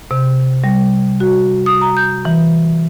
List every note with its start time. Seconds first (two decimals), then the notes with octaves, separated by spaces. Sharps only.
0.11 C3
0.64 G3
1.20 F#4
1.66 D#6
1.81 A#5
1.97 G6
2.25 E3